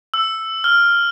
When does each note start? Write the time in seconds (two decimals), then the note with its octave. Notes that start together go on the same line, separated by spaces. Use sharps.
0.14 E6
0.64 F6